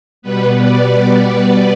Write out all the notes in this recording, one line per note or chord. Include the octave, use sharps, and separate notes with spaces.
B2 G3 B3 B4
D5